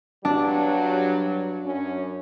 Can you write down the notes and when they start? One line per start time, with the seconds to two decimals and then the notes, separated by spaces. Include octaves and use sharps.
0.25 G2 F#3 D4
1.64 F#2 C#4